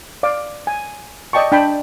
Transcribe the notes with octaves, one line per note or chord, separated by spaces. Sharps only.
D5 F5 D6
G#5
D5 D#5 G5 A5 C#6
D4 G5 A5 B5